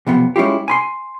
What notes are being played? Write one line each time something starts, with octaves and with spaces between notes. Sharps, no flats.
B1 F2 C3 B3
G#3 C#4 E4 F4 G4
G#5 B5 C6